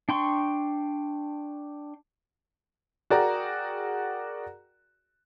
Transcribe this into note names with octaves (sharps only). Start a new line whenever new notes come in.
D4 G5 C6 C#6
F#4 G#4 A#4 D5 G5 A#5